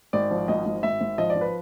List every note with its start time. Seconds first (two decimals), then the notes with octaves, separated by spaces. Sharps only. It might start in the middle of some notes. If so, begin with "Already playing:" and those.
0.13 G#1 D5
0.31 F3
0.48 G#1 D#5
0.65 G#1
0.83 G#1 E5
1.01 G#1
1.18 F3 D#5
1.30 D5
1.35 F3
1.41 B4